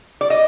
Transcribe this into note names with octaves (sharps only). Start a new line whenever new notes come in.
D5
D#5